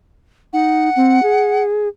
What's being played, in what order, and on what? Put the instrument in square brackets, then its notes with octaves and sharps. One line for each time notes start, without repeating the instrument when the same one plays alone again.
[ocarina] D#4 [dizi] F#5
[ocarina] C4
G#4